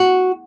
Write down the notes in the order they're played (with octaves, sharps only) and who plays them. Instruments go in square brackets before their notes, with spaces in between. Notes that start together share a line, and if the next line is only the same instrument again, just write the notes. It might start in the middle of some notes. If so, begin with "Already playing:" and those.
Already playing: [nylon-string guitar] F#4